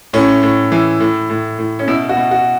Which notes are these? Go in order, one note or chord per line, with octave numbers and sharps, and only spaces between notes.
A2 C#4
A2
E3
A2
A2
A2
C#4
B2 E4
F#4
B2
F#4